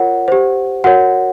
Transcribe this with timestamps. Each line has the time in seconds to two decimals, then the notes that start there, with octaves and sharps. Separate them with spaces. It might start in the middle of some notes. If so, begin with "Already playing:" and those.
Already playing: F4 A#4 C#5 F#5
0.28 G4 C5
0.84 F#4 A#4 C#5 F#5